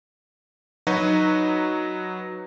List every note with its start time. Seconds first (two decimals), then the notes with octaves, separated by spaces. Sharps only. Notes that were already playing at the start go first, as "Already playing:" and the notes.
0.87 F#3 D#4 F#4 B4 D#5